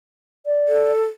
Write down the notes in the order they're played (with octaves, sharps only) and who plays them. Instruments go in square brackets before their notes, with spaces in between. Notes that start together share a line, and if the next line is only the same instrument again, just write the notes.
[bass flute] D5
[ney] A4